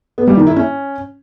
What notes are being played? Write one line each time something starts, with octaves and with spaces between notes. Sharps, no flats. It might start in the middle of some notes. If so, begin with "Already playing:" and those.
B3
G3
D#3
E4
C#4